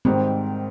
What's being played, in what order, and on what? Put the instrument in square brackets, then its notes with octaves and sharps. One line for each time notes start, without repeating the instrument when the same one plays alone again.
[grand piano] G#2 D#3 G3 [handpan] C4